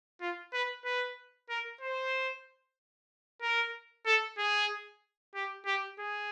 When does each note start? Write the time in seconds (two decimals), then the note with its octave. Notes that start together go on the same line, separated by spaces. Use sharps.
0.21 F4
0.53 B4
0.85 B4
1.49 A#4
1.81 C5
3.42 A#4
4.06 A4
4.38 G#4
5.34 G4
5.66 G4
5.99 G#4